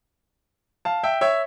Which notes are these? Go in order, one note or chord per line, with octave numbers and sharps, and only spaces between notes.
F5 A5
E5 G5
C#5 E5